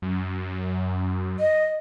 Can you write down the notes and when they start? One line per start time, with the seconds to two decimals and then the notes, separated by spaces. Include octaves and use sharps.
0.02 F#2
1.40 D#5